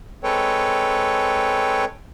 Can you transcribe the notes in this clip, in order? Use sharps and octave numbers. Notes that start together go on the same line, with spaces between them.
G#3 C4 A4 B4 C#5 G5